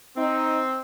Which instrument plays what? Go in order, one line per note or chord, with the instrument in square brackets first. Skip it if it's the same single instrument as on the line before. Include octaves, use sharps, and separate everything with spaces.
[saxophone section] C4 [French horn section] D#4